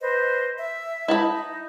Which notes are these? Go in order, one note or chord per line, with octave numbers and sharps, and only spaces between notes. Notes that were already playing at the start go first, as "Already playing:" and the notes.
B4 C5 D#5
E5
D#4 E4 A5 B5